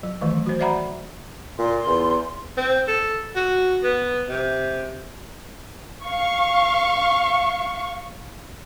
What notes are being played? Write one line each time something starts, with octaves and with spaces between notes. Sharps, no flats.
F#3
D#3 E3 F#3 A3
F#4 C5
C5 D5 E5 F#5 A#5 B5
A#2 C6
E2
C4
A4
F#4
B3
C3
F5 C#6